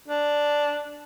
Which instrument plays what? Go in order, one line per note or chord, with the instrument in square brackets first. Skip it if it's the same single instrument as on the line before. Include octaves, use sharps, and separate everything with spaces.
[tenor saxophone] D4